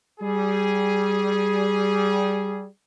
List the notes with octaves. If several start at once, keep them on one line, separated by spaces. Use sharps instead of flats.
G3 G#4